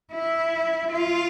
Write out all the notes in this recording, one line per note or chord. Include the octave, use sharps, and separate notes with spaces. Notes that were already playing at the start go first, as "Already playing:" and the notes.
E4
F4